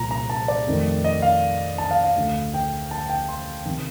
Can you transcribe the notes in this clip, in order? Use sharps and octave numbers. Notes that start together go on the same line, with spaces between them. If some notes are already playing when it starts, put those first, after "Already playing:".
Already playing: C2 A#2 F3 A#5
A#5
A5
D5
F2 D#3 A3
D#5
F5
A5
F5
F5
D2 D3 A3
G5
A5
G5
C6
C3 D#3